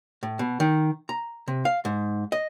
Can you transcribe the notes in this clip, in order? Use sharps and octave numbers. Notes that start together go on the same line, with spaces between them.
A2
B2
D#3
A#5
C3
F5
G#2
D#5